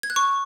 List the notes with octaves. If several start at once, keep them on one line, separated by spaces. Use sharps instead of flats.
G#6
F#6
C#6